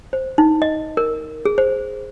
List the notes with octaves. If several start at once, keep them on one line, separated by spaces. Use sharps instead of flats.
C5
D#4
D#5
A#4
G#4
C5